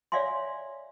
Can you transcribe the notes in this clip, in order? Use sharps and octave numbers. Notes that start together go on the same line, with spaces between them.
C#5 D5 E5 F5 G#5 C6